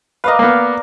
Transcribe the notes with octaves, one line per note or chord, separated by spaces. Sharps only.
A#4 B4 D5 D#5 F5
A#3 B3